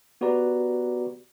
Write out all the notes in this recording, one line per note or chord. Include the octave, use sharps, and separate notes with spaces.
B3 F#4 G4 B4 D5 A#5